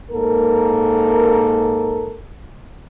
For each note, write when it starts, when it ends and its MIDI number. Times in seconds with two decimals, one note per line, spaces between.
0.12 2.18 44
0.12 2.18 58
0.12 2.18 69
0.12 2.18 70